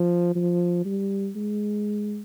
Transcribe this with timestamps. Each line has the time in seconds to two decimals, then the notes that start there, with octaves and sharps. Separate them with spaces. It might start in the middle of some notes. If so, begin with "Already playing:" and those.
Already playing: F3
0.35 F3
0.85 G3
1.36 G#3